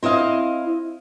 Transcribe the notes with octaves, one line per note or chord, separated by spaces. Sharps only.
C4 E4 D#5 F5